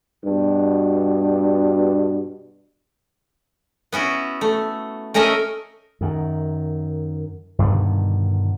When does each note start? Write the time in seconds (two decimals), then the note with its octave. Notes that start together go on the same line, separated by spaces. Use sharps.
0.24 G2 B2
3.92 B3 C#4 E4 F#4
4.41 A3
5.14 A3 C#4 A#4 D#5 E5 G#5
6.01 F#2 D#3
7.59 G2 B2 D3 D#3